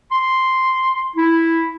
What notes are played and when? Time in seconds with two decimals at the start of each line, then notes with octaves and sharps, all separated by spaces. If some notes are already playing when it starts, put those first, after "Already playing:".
0.11 C6
1.16 E4